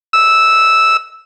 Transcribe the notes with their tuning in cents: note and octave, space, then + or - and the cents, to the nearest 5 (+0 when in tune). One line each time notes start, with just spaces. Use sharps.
E6 -5